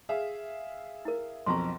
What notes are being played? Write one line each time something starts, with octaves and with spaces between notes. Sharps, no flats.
G#4 E5 F5
E4 A#4
B1 F2 A#5 C6 C#6